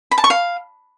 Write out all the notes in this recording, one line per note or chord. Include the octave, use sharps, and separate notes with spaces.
B5
A5
C#6
F5